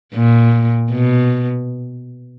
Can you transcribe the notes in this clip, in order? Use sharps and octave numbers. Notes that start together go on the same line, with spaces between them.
A#2
B2